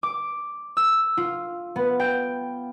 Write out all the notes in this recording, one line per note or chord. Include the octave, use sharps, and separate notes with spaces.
D6
E6
F4
B3
G5